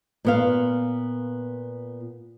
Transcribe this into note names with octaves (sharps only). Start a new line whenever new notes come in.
A#2 B3 F5